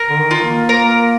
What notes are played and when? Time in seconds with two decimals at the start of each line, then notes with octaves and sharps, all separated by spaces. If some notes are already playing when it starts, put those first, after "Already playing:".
Already playing: A#4
0.10 D3
0.18 D#3
0.31 F4
0.44 A#3
0.69 A#3 A#4